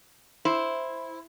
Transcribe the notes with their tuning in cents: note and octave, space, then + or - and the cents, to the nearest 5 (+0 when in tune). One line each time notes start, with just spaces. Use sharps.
E4 +0 C5 +0